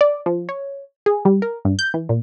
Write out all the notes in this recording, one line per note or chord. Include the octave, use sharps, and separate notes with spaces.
D5
F3
C#5
G#4
G3
A#4
G2
G6
E3
A#2